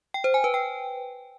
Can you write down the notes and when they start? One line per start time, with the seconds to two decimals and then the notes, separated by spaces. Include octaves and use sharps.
0.14 G5
0.24 C5
0.34 G#5
0.44 B4
0.54 G5